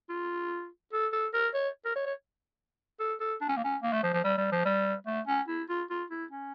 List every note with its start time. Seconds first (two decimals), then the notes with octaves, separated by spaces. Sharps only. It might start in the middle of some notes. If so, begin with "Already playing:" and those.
0.10 F4
0.93 A4
1.13 A4
1.34 A#4
1.54 C#5
1.85 A#4
1.96 C#5
2.06 C#5
3.00 A4
3.20 A4
3.41 D4
3.49 C#4
3.57 A#3
3.64 C#4
3.82 A#3
3.93 A3
4.03 F3
4.13 F3
4.24 G3
4.38 G3
4.52 F3
4.65 G3
5.07 A3
5.27 C#4
5.48 E4
5.69 F4
5.90 F4
6.10 E4
6.31 C#4